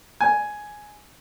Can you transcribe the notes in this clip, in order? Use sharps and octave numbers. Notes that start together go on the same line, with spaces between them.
G#5